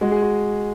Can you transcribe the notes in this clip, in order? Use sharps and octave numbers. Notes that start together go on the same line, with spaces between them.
G#3 F#4
G#4
F#4